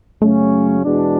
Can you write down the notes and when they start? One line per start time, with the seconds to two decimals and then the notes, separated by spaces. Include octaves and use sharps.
0.22 F#2 C#3 F#3 A3 C#4
0.85 E2 B2 G#3 D4